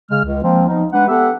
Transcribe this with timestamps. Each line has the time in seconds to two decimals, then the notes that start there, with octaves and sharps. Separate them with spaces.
0.11 C#3 G#3 F6
0.24 C#2
0.43 F3 G#3 A#3 C4
0.66 F3 B3 D#4
0.93 G#3 D4 B4 F#5
1.08 B3 G4 A4 E5 F#5